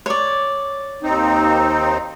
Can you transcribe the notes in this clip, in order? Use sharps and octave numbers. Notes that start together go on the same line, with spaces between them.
C#5 D5
D#2 C4 D#4